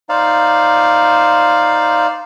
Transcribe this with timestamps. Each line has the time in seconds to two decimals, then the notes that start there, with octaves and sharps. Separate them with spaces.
0.09 D#4 C5 D5 F5